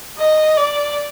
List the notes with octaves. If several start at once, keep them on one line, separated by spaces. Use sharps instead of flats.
D#5
D5